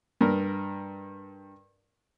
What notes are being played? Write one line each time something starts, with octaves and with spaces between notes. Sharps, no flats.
G2 A#4